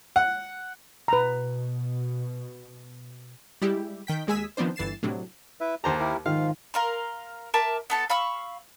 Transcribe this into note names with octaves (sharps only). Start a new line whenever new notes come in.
F#5
B2 B4 A#5
G3 G#3 E4 G4
D#3 G5 B6
D#2 G#3 G#4 G#5 E6 B6
D#3 F3 B3 C4 D4 C5
G1 E3 A6 C7 E7
A2 C3 F#3 D4
E4 B4 E5
D#2 G4 C5 A5 A#5
E4 G4 A#4
G#2 D#3 F3 F4 F5
A#4 F5 C6
A#4 E5 A5 D6
B3 A4 A5
F5 B5 C#6 E6